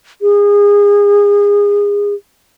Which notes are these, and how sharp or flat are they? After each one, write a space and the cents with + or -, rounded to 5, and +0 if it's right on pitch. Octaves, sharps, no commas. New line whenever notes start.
G#4 -30